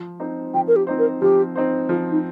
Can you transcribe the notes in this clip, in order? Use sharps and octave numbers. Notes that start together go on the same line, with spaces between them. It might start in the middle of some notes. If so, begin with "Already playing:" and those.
Already playing: F3
C4 D#4 C5
F3 G5
A#4
G4
C4 D#4 C5
A#4
F3 G4
C4 D#4 C5
F3 F4
D#4